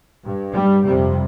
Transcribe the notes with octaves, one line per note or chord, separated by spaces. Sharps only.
G2
G3
F2 C3 G3